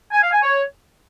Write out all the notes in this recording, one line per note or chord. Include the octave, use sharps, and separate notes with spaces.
G#5
F5
G#5
C#5